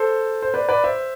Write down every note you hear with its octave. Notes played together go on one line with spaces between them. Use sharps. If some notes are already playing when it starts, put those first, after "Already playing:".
Already playing: A4 C5
C5
B4 D5
B4 D5
C5 E5